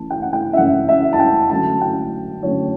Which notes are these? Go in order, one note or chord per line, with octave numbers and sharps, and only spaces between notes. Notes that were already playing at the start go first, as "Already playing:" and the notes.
Already playing: E3 A3 C#4 A5
G5
F#5
G5
E5
E3 A3 C#4 F#5
E5
A5
G5
D3 F#3 A3 C#4 A5
G5
D3 F#3 A3 C#4 C#5